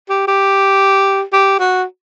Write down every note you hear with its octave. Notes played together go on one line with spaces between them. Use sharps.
G4
G4
G4
F#4